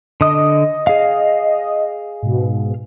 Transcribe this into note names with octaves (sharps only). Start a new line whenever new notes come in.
D3 D#5 D#6
G#4 F5
G#2 B2